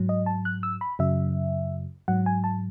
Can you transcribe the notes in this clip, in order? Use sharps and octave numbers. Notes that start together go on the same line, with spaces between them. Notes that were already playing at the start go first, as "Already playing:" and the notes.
Already playing: G#2 F#3
D#5
A5
F#6
E6
B5
F#2 C#3 F#3 E5
G#2 F#3 F#5
G#5
A5